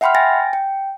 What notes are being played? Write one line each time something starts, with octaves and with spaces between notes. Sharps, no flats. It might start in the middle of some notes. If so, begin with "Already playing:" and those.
E5 F#5 G5 B5 C6 F6
G5 G#5 A6 A#6
G5